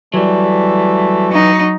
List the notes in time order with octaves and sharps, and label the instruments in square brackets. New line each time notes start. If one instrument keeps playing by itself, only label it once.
[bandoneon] E3 [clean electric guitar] F#3 G3 [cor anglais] A3
[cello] F#3 D#4 [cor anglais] F#4